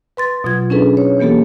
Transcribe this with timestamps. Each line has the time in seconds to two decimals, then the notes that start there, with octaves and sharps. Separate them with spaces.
0.17 B4 C6 A6
0.44 B2 F#3 F4 G#6
0.70 C#4 D4 E4 G#4 A4 B4
0.97 C#5
1.19 E3 A#3 B3 G4 A4